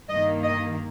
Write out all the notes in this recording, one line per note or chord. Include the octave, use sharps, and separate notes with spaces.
G2 D#3 A#3 D#5
D#5